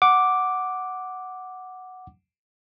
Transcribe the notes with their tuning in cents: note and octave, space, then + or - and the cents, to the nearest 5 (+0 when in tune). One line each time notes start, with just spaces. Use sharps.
F#5 +0 D6 +0